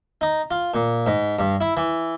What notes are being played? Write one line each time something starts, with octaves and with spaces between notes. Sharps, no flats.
D#4
F4
A#2
G#2
G2
E4
E3